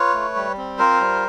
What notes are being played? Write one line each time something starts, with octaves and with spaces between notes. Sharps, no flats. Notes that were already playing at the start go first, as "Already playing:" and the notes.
Already playing: F4 B4 C#5
A3
G3
C4
F4 A#4 C5
G3